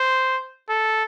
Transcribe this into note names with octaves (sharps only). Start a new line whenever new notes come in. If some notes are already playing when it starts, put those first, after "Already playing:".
Already playing: C5
A4